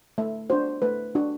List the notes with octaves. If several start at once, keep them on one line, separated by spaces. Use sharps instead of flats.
A3 E5
D4 F#4 C5
A3 B4
D4 F#4